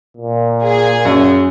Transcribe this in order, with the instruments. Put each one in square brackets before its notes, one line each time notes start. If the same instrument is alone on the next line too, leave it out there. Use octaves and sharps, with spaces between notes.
[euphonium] A#2
[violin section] G#4
[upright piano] F#2